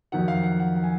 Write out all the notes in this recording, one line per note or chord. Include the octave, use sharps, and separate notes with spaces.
F2 D#3 F#3 F#5
F5
F#5
F#5
F#5
G#5